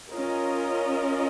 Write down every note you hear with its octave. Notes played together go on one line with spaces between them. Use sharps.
C#4 F4 A#4 D#5